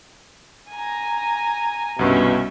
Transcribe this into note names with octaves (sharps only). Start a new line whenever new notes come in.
G#5 A#5
C2 G2 B2 C#4 E5